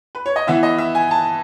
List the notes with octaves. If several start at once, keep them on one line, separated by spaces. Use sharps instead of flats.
B4
C#5
D#5
E3 B3 E4 E5
D#5
E5
G#5
A5